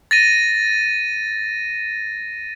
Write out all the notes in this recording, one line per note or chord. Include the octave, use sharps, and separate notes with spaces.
A6 A#6 D#7